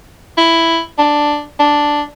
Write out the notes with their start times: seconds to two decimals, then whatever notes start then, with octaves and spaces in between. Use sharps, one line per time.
0.38 E4
0.99 D4
1.59 D4